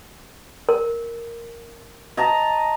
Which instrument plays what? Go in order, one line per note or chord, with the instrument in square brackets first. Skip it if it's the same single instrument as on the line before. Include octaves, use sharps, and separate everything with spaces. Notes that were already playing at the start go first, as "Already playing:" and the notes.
[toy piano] A#4
[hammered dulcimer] D#5 A5 A#5